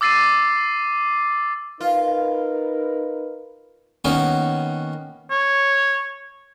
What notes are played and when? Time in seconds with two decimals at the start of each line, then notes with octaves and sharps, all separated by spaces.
0.01 D6 E6 A6 C7 D#7
1.81 D#4 F4 A#4 B4
4.04 D#3 A#3 B3 C#4 F#4
5.31 C#5